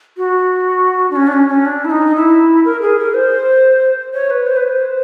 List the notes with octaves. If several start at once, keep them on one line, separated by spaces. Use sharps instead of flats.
F#4
D4
C#4
D4
C#4
C#4
D4
E4
D#4
E4
A#4
G#4
A#4
C5
C#5
B4
C5
B4
C5